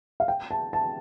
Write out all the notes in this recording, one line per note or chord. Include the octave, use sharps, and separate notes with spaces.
F5
G5
A5
A5